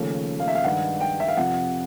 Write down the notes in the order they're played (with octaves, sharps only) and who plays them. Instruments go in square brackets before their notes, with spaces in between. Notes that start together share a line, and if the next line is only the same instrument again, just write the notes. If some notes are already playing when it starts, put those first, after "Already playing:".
Already playing: [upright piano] D#2 C#3 F3 A3 C#4
F5
E5
F5
G2 D#3 G#3 F#5
G5
E5
F5
F2 C3 F3 F#5